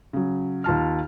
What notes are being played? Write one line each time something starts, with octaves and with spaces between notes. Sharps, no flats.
C#3 F#3
D#2 F4 A5 F6